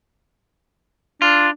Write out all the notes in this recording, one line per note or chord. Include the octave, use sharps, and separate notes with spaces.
D4 F4